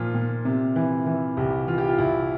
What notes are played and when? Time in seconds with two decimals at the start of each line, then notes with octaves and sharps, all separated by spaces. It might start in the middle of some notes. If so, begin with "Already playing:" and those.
Already playing: A#2 F3 F4
0.14 A#2
0.45 C3
0.76 E3
1.06 E3
1.37 C2 G4
1.67 E3 F4
1.78 G4
1.88 F4
1.98 C2 E4